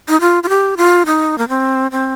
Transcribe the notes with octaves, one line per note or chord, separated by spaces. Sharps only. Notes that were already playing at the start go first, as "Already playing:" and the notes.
D#4
F4
F4
G4
F4
D#4
A#3
C4
C4